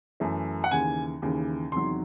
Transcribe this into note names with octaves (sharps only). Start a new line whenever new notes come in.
F#2 E3 A3
F#5
D#2 C#3 E3 G#5
D#2 C#3 E3
E2 C3 D#3 F#3 C6